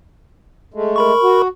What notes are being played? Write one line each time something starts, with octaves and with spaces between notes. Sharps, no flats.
G#3 A3
A#4 B5 C#6
F#4